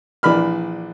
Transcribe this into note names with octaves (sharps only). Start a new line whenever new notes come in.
A#1 E3 D5 B5 F6